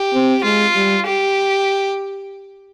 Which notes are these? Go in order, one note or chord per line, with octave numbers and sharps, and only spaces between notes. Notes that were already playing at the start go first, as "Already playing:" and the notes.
Already playing: G4
C4
G#3 F4
G3
G4